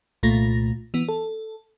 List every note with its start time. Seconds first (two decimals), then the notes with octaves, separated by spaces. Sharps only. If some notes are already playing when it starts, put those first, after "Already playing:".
0.23 C2 A#2 A3 F4 A#6
0.94 E3 B3
1.08 A4